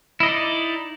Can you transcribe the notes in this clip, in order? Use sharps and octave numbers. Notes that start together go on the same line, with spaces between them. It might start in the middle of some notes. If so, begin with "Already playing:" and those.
D#4 E4 D5 D#5